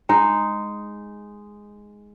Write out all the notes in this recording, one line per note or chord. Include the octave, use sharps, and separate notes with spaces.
G#3 D#4